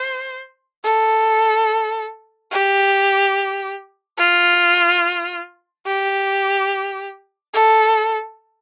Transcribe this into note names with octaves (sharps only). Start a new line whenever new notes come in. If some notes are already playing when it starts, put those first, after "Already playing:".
Already playing: C5
A4
G4
F4
G4
A4